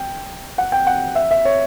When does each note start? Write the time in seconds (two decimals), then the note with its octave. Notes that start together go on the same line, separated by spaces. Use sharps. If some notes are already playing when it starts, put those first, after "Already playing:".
Already playing: G5
0.58 F#5
0.72 G5
0.87 F#5
1.15 E5
1.31 E5
1.45 C#5